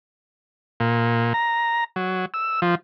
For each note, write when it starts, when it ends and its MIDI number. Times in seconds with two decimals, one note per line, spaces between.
0.80 1.33 46
1.34 1.84 82
1.96 2.25 54
2.34 2.60 88
2.62 2.75 53